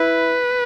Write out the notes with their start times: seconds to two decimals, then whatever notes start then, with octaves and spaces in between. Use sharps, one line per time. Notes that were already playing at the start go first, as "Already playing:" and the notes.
Already playing: E4 B4